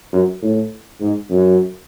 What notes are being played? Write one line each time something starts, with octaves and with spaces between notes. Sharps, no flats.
F#2
A2
G#2
F#2